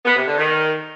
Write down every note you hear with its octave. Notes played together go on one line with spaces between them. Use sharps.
B3
C3
D3
D#3